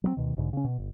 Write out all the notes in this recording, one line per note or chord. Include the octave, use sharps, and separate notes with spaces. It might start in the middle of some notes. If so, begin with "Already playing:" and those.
F#3 G#3 C4
D2 B2 D#3
B1 G#2 D3
C#3 C#4
B2
G1